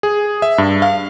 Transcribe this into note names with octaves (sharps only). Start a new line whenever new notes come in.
G#4
E5
G2
F5